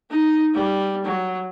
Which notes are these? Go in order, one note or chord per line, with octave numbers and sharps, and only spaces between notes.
D#4
G3
F#3